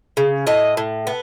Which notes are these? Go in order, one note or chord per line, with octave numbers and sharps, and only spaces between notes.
C#3
A2 D#5
A2
B3